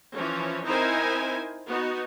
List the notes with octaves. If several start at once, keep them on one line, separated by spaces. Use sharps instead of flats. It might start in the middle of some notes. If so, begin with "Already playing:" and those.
E3 F3 C#4
C4 D#4 E4 A#4 C5 G#5
B3 D#4 F#4